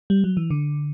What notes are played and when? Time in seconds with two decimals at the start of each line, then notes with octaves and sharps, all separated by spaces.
0.10 G3
0.24 F#3
0.37 E3
0.50 D3